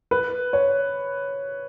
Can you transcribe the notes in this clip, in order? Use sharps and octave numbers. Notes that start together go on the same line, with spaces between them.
B4
C#5